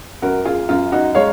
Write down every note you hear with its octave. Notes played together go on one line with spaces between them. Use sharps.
F#2 F#4 A#4
F4 G#4
F#2 F4
D#4 F#4
G#3 C#5 F5